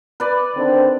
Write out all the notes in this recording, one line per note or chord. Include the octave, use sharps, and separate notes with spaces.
B4 D5
D3 D#3 C4